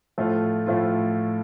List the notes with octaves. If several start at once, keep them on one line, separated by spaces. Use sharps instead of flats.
A2 F3 A3 F4
A2 F3 A3 F4